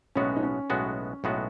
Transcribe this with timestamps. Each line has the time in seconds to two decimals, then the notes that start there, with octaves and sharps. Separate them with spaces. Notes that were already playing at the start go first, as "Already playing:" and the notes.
0.15 B1 A2 G#3 B3 C#4 F#4
0.36 D#4
0.43 C#4
0.70 B1 A2 G#3 B3 F#4
1.24 B1 A2 G#3 B3 F#4